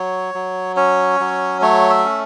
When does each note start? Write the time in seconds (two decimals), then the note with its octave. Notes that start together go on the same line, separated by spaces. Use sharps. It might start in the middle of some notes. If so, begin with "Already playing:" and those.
Already playing: F#3 C#5
0.34 F#3
0.76 C#4 C#5
1.20 F#3
1.61 A3 C#5
1.90 E5
2.05 C#4